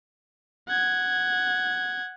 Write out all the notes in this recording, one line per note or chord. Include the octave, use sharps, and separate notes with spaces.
F#5 G#6